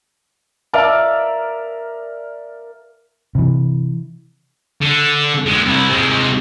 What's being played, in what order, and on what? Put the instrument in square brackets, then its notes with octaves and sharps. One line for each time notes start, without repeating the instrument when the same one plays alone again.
[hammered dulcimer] A#4 D5 E5 F5
[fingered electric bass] C3 E3
[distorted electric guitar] D3
D3 G#3
C2 E4
C3 G#3